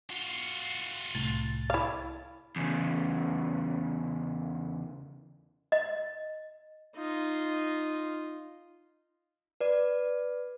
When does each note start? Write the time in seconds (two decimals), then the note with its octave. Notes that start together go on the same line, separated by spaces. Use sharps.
0.10 F4 F#4
1.15 C2 A2 A6
1.70 E4 F5
2.56 E2 C#3
5.72 D#5
6.96 D#4 F4
9.61 B4 D5